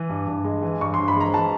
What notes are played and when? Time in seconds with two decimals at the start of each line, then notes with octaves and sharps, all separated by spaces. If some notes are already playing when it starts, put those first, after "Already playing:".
Already playing: E3
0.09 G2
0.27 G2
0.44 G#3
0.63 E3
0.80 G2 C#6
0.94 G2 C6
1.08 B5
1.16 G#3 A#5
1.34 E3 A5